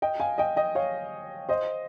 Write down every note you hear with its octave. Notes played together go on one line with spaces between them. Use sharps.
D#5 G5
F5 G#5
D#5 G5
D#5 G5
C#5 F5
C5 D#5